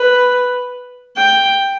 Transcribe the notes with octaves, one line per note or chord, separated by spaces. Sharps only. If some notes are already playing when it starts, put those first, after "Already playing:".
Already playing: B4
G5